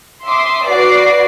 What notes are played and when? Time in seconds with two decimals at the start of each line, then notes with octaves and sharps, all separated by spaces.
0.24 E5 C6 D6 D#6
0.66 F#4 B4 D5 D6 C7